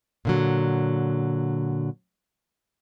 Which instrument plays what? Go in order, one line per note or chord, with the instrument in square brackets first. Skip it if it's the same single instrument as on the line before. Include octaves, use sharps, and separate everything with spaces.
[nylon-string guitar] A#2 D3 F#3